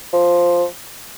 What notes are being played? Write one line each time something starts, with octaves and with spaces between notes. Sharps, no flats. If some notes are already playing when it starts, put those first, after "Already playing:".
F3